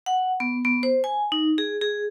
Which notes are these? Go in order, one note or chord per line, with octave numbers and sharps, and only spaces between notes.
F#5
B3
B3
C5
G#5
D#4
G#4
G#4